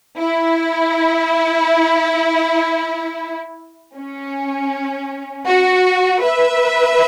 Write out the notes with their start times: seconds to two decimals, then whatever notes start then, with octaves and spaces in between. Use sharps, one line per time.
0.19 E4
3.96 C#4
5.47 F#4
6.22 B4 E5